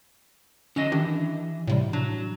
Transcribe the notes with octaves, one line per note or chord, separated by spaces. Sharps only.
D3 F#3 C#4 D#5 E7
D#3 E3 D4 G4
A2 C3 G3
F#3 D4